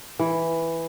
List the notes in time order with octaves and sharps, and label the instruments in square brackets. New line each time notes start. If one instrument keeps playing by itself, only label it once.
[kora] E3